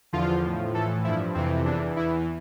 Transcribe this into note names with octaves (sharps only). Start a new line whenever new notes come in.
E2 D3 F3 F4
A2 F3
A2 E3 A4
G2 F3 E4
F2 C3 E3 C4
E2 E3 D4
E2 E3 E4